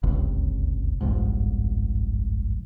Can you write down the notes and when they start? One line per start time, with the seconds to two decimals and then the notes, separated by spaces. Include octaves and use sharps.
0.03 D1 G1 C#2 C3
1.01 G1 C2 F2 G#2